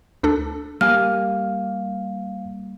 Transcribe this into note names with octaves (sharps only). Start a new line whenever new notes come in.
D2 D4 A4
G3 A#3 F5 G#5 F6